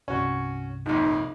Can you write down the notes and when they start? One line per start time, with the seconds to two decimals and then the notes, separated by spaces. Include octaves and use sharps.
0.08 C2 G2 C3 C#4 F#4
0.86 A#1 F2 D#4